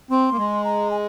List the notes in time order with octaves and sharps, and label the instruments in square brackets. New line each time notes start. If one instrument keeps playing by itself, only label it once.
[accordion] C4 [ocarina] C6
[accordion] A#3
G#3
[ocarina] A#5
G#5